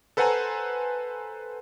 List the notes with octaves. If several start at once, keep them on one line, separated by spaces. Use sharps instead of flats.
A4 B4 C5 F#5 G#5 A#5